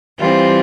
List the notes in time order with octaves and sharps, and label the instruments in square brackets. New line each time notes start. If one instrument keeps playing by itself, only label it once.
[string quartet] E3 G3 C4 F4